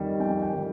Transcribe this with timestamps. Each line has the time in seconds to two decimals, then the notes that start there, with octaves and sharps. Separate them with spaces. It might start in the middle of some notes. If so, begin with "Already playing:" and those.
Already playing: F2 D#3 G3
0.20 F2 G5
0.42 G5
0.53 D#3 G3